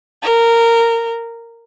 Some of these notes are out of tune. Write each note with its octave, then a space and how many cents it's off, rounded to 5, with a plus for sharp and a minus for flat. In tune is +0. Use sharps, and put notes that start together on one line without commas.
A#4 -15